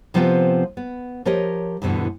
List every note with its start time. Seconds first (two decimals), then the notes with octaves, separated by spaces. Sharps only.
0.14 C3 F3 G3 B3 C4 F4
0.77 B3
1.25 F3 G4 A#4 C#5 D#5
1.82 D2 G2 B2 D3 E3